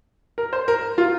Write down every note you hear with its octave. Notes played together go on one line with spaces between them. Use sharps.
A#4
C5
A#4
F4